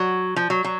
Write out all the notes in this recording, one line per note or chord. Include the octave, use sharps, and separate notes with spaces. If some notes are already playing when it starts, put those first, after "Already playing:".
Already playing: F#3
F3
F#3
F#3